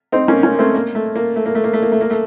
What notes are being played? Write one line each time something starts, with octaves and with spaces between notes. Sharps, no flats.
C4 D#4
A#3 C#4
A#3 C#4
A#3
A3 C4
A#3
A3
A#3
A3
A#3
A3
A#3
A3
A#3
A3
A#3
A3